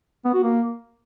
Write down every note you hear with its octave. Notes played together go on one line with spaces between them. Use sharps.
B3
F#4
A#3